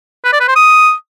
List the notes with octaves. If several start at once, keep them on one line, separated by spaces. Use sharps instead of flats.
B4
D5
B4
C5
D#6